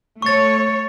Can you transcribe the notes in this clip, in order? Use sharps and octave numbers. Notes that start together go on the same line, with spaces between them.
A3 C#5 C#6 A6